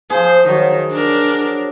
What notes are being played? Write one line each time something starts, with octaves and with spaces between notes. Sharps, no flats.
F3 G#4 C5
D#3 F#3
D4 A#4